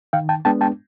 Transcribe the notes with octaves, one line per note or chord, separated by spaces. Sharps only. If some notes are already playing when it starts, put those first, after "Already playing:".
D#3 F5 G5
G5 A5
G#3 B3 D4 G5 A5
G5 A5